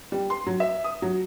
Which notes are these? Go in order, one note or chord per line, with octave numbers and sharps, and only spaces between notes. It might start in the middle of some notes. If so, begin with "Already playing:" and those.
G3
C6
F#3
E5
D#6
F#3